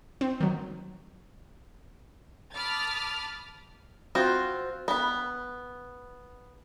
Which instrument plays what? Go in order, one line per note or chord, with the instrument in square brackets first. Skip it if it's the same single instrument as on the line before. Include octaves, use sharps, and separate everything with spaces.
[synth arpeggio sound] C4
D#3 F#3
[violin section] A5 B5 D6 D#6 F6 A6
[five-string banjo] C4 F4 F#4
B3 B5